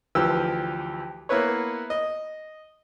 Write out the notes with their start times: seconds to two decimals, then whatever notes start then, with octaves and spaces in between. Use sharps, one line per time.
0.15 D2 E3 F3 G4 E6
1.29 A#3 B3 E4 B4 C#5
1.90 D#5